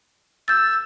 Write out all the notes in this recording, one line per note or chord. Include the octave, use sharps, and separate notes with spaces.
E6 G6 A6